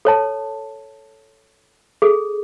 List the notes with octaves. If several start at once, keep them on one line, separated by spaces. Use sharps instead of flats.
A4 C#5 A5
G#4 A4